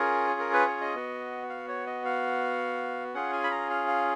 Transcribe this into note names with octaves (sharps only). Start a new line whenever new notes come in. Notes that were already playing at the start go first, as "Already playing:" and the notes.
Already playing: C#4 F4 G#4 A#4
A#4
B4
C#5
D#5
B3 F#4
F5
C#5
D#5
F5
C#4 F4 G#4 F#5
G#5
B5
A#5
F5
F5